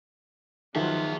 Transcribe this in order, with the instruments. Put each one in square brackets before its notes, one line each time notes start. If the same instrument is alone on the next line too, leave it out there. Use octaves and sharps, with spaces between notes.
[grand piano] D#3 [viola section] F3 F#3 F4 [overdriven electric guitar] G#4 E5